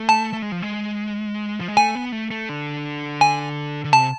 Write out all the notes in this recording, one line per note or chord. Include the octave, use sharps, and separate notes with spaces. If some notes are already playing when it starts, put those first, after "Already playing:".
Already playing: A3
A5
A3
G#3
F3
G#3
F3
G#3
A3 G#5
B3
A3
A3
D3
G#5
D3
C3 A5